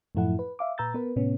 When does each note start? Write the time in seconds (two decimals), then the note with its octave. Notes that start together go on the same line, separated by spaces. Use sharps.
0.15 F#2 A2 F3 E4 A4 F#5
0.39 B4
0.59 E5 F5 D6
0.78 A#2 B4 A#5 E6 G6 A6
0.94 B3 A#4 B4
1.16 A2 C3 B3 C#4